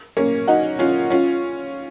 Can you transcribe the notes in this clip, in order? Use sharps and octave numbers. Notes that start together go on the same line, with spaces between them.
A#3 C#4
D#4 F#4
C#4 F4
C#4 F4